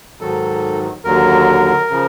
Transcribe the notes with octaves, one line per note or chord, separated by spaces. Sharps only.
G#2 D#3 F#3 A4
D#2 D3 F#3 A#4
C#3 F3